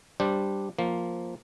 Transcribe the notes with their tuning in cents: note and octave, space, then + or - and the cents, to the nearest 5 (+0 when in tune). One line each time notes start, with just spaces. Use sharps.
G3 +0 D4 +0 C5 -10
F3 +0 A#3 +0